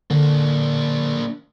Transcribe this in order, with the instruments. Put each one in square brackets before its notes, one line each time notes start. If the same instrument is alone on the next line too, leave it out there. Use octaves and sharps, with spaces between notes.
[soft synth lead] D3 [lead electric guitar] A#3 D4